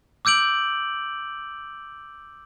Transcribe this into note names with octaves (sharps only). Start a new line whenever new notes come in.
D6 E6 G6 D7 F#7